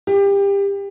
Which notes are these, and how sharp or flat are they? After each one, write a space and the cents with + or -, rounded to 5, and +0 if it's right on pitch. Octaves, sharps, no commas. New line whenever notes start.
G4 +25